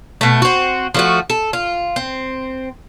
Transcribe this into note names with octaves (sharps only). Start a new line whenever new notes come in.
B2 A3
C4 F#4
F3 A3 F#4
A4
F4
C4